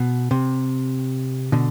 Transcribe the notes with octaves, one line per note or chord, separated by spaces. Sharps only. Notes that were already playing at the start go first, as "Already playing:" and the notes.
Already playing: B2
C3
B2 D3